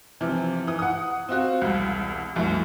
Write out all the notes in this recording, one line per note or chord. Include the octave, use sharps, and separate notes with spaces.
C3 E3 F3
E3 D#6
F#5 D#6
C4 F4 F#4
E1 C2
C2 F#2 E3 A3